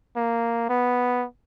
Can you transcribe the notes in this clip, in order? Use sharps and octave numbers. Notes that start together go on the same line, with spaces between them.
A#3
B3